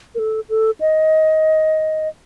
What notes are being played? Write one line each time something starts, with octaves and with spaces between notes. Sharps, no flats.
A#4
A4
A4
D#5